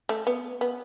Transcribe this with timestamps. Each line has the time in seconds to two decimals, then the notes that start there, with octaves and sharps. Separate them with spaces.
0.09 A3
0.27 B3
0.61 B3